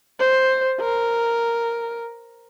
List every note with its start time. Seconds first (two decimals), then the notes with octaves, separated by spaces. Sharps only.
0.19 C5
0.81 A#4